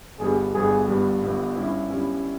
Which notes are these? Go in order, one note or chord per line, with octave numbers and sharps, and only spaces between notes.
G1 G2 G3 B3 G#4
G1 G2 G3 B3 G#4
G1 G2 G3 B3
G1 G2 G3 B3
G2 G3 C#4 E4
G2 G3 C#4 E4